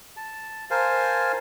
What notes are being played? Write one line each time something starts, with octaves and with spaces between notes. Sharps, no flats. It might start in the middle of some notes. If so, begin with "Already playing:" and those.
A5
A#4 C5 F5 G#5 A5